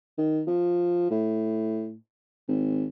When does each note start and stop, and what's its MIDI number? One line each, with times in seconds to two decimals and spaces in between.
0.18 0.42 51
0.47 1.06 53
1.11 1.96 45
2.48 2.86 32